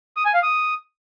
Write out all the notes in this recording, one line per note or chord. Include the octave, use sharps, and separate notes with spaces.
D#6
G#5
F5
D#6